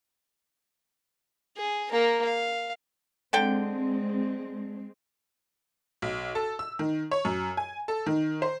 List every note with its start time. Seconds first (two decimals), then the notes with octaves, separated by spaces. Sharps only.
1.57 G#4
1.91 A#3 A#4
2.25 F5
3.33 D3 G#3 C4 A4 G5
6.02 B1
6.35 A4
6.59 E6
6.79 D#3
7.11 C#5
7.25 F#2
7.57 G#5
7.88 A4
8.06 D#3
8.42 C5